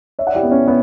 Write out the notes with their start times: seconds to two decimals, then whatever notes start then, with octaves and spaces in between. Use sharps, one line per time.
0.19 C#5 E5
0.27 D5 F#5
0.35 E4 G4
0.43 B3
0.51 C#4
0.68 B3